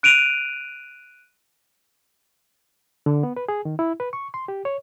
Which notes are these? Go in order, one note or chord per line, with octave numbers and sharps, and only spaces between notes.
F#6 D7 D#7 F7
D3
B3
B4
G#4
D#3
E4
B4
C#6
C6
G4
C#5